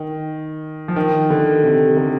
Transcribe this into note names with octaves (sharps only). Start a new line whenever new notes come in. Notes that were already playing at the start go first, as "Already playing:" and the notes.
Already playing: D#3
F3
D#3
D3
C3
D3